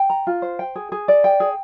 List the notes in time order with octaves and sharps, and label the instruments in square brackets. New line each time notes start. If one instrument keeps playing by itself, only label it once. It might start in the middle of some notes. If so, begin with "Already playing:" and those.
Already playing: [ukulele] G5
A#5
F4
C5
G5
G#4
G#4
D5
G5
G#4